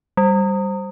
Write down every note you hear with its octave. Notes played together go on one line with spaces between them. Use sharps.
G3